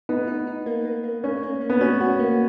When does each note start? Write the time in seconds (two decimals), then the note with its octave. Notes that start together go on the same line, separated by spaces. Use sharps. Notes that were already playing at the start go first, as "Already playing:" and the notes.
0.09 B3 D#4
0.27 D#4
0.47 D#4
0.66 A#3
0.85 A#3
1.04 A#3
1.24 A#3 C#4
1.43 A#3
1.61 A#3
1.70 B3
1.81 C#4 F#4
2.01 F#4
2.19 A#3